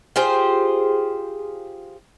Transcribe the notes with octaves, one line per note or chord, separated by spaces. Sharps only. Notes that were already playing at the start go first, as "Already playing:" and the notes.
F4 G4 G#4 C5